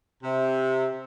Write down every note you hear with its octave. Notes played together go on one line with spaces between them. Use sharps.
C3